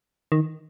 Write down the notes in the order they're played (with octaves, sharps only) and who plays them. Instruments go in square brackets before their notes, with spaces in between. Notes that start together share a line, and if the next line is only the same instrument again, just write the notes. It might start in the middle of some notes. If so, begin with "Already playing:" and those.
[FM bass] D#3